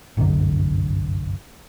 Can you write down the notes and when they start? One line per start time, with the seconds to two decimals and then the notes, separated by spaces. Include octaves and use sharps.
0.17 G1 C2 F#2 D3